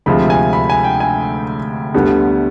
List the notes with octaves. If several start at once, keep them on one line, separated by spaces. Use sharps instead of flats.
D2 C3 F3 G#3 B5
G#5
B5
G#5
G5
G#5
D2 D3 G3 B3